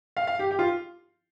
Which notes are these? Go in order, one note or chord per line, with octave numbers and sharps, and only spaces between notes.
F5
F5
G4
G4
F4